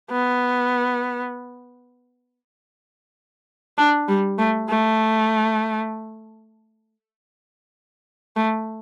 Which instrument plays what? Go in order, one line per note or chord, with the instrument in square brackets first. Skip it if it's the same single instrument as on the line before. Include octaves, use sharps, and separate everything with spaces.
[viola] B3
D4
G3
A3
A3
A3